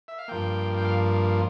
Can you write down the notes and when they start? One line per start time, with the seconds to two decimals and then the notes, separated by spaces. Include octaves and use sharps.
0.08 E5
0.18 F5
0.28 G2 F3 A#3 G5
0.77 G5
0.85 F5